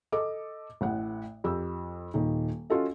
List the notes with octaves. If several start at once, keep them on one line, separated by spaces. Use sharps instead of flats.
A4 D#5 D6
A1 A2 F#5
F2 G4 E6
D#1 D#3
C#4 F4 F#4 A4 D#5